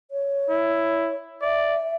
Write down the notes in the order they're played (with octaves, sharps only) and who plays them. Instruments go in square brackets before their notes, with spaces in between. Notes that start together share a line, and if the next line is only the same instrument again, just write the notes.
[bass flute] C#5
[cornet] E4
[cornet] D5 [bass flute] E5